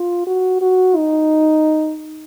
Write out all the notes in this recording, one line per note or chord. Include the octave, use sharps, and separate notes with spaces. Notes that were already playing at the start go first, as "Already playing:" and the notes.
Already playing: F4
F#4
F#4
D#4